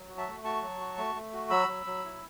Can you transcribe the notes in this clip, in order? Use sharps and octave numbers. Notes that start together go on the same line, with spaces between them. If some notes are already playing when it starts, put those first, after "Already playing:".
Already playing: F#3
F#4
E5 A5
A3
F#4 A5 C#6
F#3
F#4
A3
A3
F#4
F#3 B5 E6
F#3
F#3
E4